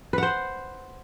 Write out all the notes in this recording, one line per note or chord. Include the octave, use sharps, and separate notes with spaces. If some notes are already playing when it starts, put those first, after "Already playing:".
B4 C5 F#5